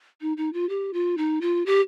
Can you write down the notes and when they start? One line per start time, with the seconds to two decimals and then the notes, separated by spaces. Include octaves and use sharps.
0.21 D#4
0.37 D#4
0.53 F4
0.69 G4
0.94 F4
1.18 D#4
1.41 F4
1.66 G4